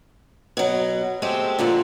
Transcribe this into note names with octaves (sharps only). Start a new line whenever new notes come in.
B2 F#3
G#3 A3 C4 G4
A#2 D3 F3 A#3